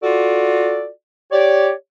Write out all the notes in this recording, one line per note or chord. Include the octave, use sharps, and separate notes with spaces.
F4 F#4 A4 D5
G4 C#5 D5